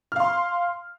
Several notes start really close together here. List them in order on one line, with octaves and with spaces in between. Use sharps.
F6 F5 C6